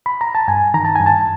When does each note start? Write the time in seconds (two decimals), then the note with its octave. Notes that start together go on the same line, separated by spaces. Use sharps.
0.06 B5
0.21 A#5
0.35 A5
0.48 G2 G#5
0.74 D#3 A#5
0.85 A5
0.96 G2 G#5
1.06 A5